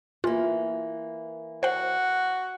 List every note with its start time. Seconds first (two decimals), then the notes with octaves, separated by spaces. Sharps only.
0.24 E3 A#3 F4
1.63 F#4 C5 F#5